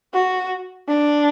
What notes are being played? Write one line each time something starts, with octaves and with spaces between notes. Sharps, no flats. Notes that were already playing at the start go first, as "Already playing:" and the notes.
F#4
D4